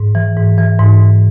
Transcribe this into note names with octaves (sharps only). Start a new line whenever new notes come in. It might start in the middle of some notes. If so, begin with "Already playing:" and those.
Already playing: G#2
E3
G#2
E3
G#2
E3